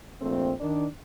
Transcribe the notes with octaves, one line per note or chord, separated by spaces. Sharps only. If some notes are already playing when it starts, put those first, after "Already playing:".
A#1 F2 A3 C4
D#3 D4